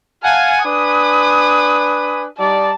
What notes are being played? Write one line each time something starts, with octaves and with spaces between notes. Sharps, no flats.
F5 F#5 G#5 A5
D4 B4 G#5 D#6
G3 D#4 D5 A5